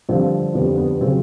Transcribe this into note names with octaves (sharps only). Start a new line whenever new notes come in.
G2 D3 F3 C4
F2 D3 G3 B3
B3
C#3 F#3 C4